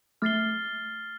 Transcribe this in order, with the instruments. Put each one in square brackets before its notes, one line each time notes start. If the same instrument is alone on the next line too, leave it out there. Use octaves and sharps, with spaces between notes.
[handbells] A3 [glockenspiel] F6 A6 C7 G7